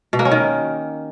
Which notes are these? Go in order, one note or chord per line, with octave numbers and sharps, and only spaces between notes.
B2
A#3
C#4
D#3